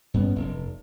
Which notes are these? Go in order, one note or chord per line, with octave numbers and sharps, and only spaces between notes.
G2 B3 C#4
F1